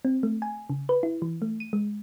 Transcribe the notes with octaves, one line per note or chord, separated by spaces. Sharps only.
C4
A3
G#5
C#3
B4
E4
E3
A3
D#7
G#3